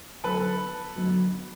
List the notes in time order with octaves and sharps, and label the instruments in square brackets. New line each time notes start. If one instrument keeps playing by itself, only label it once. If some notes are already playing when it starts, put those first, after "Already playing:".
[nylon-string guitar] D3 F#3 B3 D#4 [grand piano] A4 B4
[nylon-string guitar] D3 F#3 B3 D#4